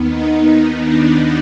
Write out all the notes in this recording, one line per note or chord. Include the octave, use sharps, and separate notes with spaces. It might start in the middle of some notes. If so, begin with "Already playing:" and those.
Already playing: D#2 D#3 B3
D#4
D#4
D4